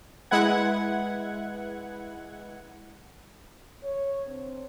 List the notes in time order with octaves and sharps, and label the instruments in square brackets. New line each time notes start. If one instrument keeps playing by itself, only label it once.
[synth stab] G#3 E4 B4 F#5 G#6
[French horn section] C#5
D3 C4